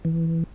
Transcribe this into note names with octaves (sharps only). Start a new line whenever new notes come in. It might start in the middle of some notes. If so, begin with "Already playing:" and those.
E3